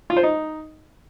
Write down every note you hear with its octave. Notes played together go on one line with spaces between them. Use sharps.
F4
C5
D#4